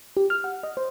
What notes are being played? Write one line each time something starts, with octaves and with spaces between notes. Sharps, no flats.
G4
F6
F#5
D#5
C5